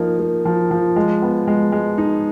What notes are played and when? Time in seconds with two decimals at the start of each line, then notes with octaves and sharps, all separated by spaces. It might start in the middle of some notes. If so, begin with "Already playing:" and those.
Already playing: F3 A#3 D#4
0.19 A#3
0.45 F3
0.71 F3
0.96 G#3
1.22 B3
1.48 G#3
1.72 G#3
1.98 D#4